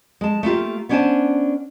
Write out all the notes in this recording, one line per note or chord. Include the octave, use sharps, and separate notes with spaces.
G#3 A5
A3 A#3 F4 G4
B3 C#4 D4 C5 G#5 A5